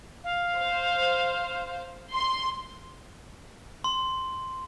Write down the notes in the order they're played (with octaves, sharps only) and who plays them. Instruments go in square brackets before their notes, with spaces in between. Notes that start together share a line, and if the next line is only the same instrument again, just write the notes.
[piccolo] F5
[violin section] C5
C6
[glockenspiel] C6